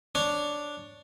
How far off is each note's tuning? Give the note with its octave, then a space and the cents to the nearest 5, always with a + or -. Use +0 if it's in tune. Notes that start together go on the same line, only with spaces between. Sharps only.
D4 +0 C#5 +5